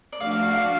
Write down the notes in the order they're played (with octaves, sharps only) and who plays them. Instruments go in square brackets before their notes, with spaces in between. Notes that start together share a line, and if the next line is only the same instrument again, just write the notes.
[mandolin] D5
[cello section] F3 A3 D4 F#4 [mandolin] F5
[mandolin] F5
F5
F5